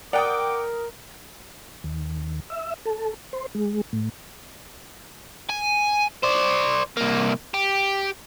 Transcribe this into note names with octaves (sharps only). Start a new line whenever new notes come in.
A#4 D5 F#5 G5 D6 D#6
D#2
E5
A4
C5
G#3
A2
G#5
C5 D5
C2 A#3
G4